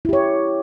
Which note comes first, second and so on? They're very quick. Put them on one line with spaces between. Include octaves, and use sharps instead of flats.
E4 G4 C#5